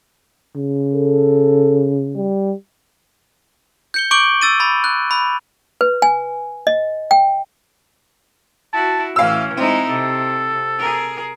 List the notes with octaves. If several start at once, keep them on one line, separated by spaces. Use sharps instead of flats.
C#3
A4
G3
G6 C#7 G7
C#6 D6 G6 D7 F#7 G7
E6 A6 D#7
B5 A6
F#6
B5
B4
G#5
D#5
G5
E4 F#4 A5
A2 E3 C#4 F5 E6
G#3 C4 D#4 E4
C3 A4
G#4 A#4